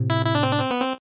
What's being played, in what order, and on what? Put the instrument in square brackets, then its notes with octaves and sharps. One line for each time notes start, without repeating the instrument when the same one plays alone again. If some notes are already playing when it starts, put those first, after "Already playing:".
Already playing: [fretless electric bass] A2 C3
[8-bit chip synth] E4
E4
D4
C4
D4
C4
B3
C4